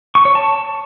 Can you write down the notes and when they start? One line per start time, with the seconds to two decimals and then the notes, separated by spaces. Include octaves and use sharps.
0.15 C#6
0.25 C#5
0.35 A5